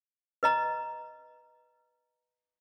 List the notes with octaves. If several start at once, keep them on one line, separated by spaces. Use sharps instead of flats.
B4 D#5 A#5